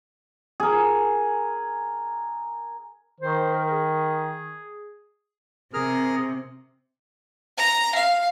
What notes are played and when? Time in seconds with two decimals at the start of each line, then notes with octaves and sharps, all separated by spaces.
0.60 G#4 A#4
3.21 D#3 C5
3.54 A#4
3.71 G#4
5.74 C3 G#4 A#4 F6
7.58 A#5
7.95 F5